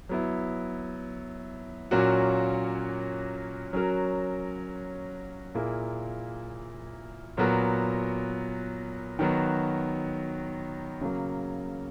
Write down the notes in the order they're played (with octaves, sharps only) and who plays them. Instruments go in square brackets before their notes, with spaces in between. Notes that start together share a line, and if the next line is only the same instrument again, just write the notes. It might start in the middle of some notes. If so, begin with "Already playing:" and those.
[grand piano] F#3 B3 E4
A#2 F#3 A#3 C#4 F#4
F#3 C#4 F#4 A#4
A#2 A#3 E4 G#4
A#2 F#3 B3 F#4 A#4
D#3 F#3 B3 F#4
C#3 F#3 A#3